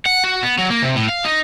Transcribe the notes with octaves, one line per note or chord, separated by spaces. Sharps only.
F#5
F#4
B3
F#3
A#3
C3
A2
F5
D#4